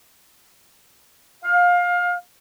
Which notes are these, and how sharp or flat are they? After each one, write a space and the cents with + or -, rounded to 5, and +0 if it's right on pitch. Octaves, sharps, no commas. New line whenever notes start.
F5 +25